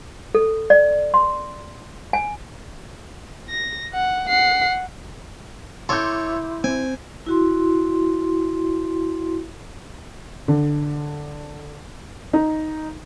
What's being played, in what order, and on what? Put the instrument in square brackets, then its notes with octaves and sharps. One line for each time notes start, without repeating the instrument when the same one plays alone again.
[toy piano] A4
D5
C6
G#5
[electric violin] A#6
F#5
F#5 C7
[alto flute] E4 [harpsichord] A4 C#5 [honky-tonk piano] C6 D6 G6
[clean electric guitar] C4 [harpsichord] G#5
[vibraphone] E4 F#4 C6
[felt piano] D3
D#4